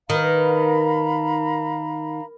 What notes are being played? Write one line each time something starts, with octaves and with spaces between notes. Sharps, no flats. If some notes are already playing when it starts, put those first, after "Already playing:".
D#3 A#4 B4 F5 A#5 B5